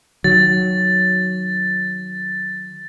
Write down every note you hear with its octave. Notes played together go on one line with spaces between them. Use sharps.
D#3 F#3 A6